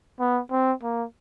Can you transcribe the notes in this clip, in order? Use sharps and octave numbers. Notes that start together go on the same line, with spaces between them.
B3
C4
A#3